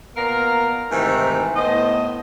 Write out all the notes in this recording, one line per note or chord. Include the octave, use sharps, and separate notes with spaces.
A#2 B3 A#4 F5 A#5
G#2 C3 D#3 E3 A3
A2 B3 C5 D#5